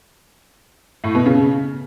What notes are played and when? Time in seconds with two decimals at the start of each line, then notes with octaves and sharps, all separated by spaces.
1.04 A2
1.15 B2
1.26 C#3